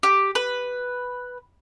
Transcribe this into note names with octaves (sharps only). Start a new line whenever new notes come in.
G4
B4